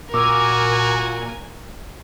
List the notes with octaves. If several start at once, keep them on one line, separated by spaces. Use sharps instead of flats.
A#2 F#4 A#4 G#5 D6 E6 F6